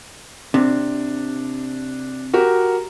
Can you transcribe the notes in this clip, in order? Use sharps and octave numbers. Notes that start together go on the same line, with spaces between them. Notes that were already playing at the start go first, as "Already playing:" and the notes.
C3 D4
F#4 G4 A#4